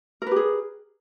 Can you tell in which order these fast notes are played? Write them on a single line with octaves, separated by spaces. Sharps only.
A#4 B4 G4 G#4